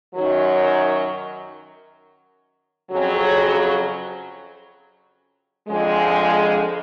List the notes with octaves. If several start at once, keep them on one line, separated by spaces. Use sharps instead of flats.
F#2 D#3 F#3
F2 C#3 F#3
F2 D3 F3 G#3